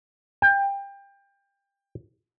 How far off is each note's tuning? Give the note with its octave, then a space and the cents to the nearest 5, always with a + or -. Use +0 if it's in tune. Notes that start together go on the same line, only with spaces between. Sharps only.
G5 +25